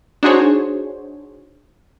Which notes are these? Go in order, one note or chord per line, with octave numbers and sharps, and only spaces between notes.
D4 D#4 F#4 G#4 C5 C#5